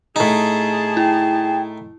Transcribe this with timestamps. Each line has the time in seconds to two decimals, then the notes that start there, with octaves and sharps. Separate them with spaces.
0.16 A2 D#4 G#4 A5
0.97 E4 G5